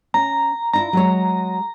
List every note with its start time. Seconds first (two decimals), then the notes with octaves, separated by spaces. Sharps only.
0.14 C#4 A#5
0.73 D4 E4 F4 A#5
0.93 F#3 G#3 C#5